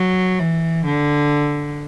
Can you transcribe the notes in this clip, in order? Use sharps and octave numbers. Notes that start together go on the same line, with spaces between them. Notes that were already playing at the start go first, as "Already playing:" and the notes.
Already playing: F#3
E3
D3